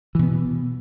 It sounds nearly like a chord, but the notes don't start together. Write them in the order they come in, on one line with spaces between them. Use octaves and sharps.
E3 B2 B3